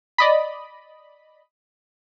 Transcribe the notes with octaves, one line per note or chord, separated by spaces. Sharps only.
D5 D#5 B5